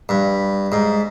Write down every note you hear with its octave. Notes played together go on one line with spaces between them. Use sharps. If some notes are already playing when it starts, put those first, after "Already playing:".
G2
G#2